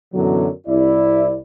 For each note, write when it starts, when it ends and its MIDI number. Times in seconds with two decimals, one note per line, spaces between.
0.14 0.48 42
0.14 0.48 47
0.14 0.48 50
0.14 0.48 52
0.14 0.48 54
0.67 1.37 36
0.67 1.37 64
0.67 1.37 74